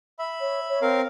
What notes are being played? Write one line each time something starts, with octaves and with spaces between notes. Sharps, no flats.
E5 B5
C#5
C#5
C4 A#4 F5